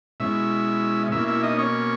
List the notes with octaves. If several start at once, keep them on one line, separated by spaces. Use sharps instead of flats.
B2 G#3 C#4 E4 E5
B2 A#3 C#4 E4 E5
E4 E5
D#4 D#5
C#4 C#5